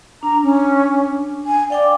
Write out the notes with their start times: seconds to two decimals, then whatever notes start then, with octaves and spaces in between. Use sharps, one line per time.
0.23 D4 A#5
0.43 C#4
1.46 G#5
1.70 D5 F5 G5 D6